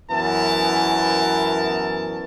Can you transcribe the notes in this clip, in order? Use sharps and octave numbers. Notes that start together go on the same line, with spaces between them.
F#2 E3 B3 C#4 A#4 A5